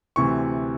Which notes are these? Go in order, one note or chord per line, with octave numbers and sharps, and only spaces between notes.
D2 C3 E3 C#6